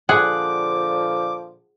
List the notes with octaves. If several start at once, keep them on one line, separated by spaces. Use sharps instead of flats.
A#2 D3 F3 G#4 F#5 D6